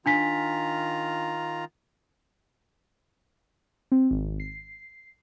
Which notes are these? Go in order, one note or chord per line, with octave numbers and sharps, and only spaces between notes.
D#3 D4 F4 G#5 A#5 B6
C4
G#1
C7